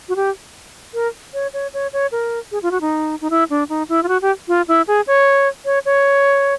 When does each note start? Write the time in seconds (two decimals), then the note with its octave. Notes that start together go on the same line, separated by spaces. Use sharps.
0.09 F#4
0.16 G4
0.94 A#4
1.34 C#5
1.54 C#5
1.74 C#5
1.93 C#5
2.12 A#4
2.52 G#4
2.62 F4
2.71 F#4
2.81 D#4
3.21 D#4
3.30 E4
3.50 D4
3.69 D#4
3.89 E4
4.03 F4
4.08 F#4
4.22 G4
4.48 F4
4.68 E4
4.87 G#4
5.07 C#5
5.65 C#5
5.85 C#5